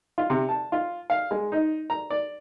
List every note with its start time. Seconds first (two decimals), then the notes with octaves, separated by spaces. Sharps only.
0.18 F4
0.30 C3
0.49 A5
0.72 F4
1.10 F5
1.31 G#3
1.52 D#4
1.90 A#5
2.10 D5